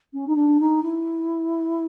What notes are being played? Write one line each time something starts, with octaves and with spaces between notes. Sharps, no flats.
C#4
D#4
D4
D#4
E4